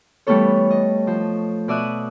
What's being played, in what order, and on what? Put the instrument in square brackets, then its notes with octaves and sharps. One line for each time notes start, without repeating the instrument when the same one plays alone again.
[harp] E3 G3 A3 B3 A4 C#5
D#5
F3
B2 D5 E5 D#6 F#6